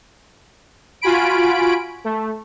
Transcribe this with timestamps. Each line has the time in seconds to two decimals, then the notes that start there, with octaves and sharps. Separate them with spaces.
1.01 F4 F#4 G#5 B5 D7
2.04 A3